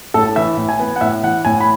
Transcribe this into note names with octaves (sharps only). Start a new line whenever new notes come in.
A2 A4
E3 E5
A2
G#5
B3
F#5
A2 E5
E3 F#5
A2 G#5
B5